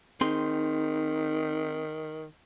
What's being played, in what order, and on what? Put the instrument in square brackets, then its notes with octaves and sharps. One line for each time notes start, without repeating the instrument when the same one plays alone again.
[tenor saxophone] D#3 [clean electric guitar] C4 G#4 C6 [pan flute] D#4